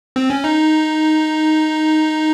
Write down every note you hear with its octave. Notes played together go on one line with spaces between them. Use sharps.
C4
C#4
D#4